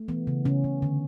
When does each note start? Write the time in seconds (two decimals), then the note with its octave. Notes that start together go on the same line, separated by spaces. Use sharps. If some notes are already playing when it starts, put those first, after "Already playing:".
Already playing: A3
0.08 E3 B3
0.27 C#3
0.45 C#3 C#4
0.64 C#3
0.82 D3